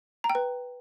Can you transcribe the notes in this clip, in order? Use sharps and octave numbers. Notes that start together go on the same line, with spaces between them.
A#5
G5
B4